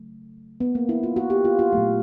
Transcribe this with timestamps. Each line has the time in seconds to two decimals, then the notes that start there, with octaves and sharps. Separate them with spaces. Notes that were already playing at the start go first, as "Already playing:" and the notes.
Already playing: C#3 F#3 A3
0.60 B3
0.75 A#3
0.89 E4
1.03 F4
1.16 F#4
1.30 G4
1.45 F4
1.59 F4
1.73 A#2 F#3 A3